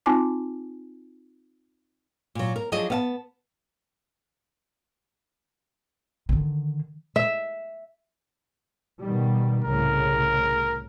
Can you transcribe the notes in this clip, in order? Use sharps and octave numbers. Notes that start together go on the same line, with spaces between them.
C4 D#4 F4 G#5 A5 D6
A#2 F#3
A#4
F3 F#3 D4 G#4 D#5
B3 F5 A5
D3 D#3
E5
B2 D#3 G3
C2 A2 C#3 A#4